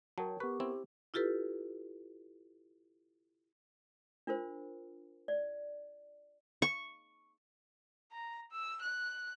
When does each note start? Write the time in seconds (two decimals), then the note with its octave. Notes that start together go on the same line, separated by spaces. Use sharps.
0.18 F#3 A#4 C#5 G5 A5
0.40 B3 G4 A#4 B4 C#6
0.60 C4 E4
1.14 E4 F4 G4 A4 B4
4.27 D4 F4 A#4 C5
5.28 D5
6.62 C#6
8.11 A#5
8.51 E6
8.82 F#6